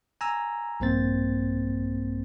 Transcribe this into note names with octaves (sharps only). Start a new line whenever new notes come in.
G#5 A#5 E6
A#1 G2 A#3 C4 C5 A6